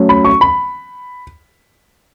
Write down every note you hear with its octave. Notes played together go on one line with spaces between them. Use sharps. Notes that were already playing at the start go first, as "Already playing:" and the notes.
Already playing: F#3 A3 C#4
B5
C#6
B5